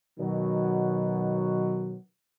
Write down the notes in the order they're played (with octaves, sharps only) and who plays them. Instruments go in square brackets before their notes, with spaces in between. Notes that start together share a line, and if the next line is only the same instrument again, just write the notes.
[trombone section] B2 D#3 F#3